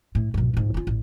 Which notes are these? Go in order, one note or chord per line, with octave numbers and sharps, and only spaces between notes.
A2
B1 G2
C#2 G#2
C#4 F4
A1